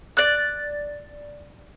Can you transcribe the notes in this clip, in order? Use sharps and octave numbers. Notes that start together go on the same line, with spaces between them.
D5 F#6